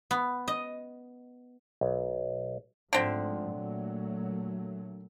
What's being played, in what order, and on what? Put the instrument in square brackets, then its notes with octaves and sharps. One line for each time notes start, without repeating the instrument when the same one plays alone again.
[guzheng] B3
D#5
[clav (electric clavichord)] B1
[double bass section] G#2 F3 A3 [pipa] D3 C4
[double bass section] A#2 F#3 A3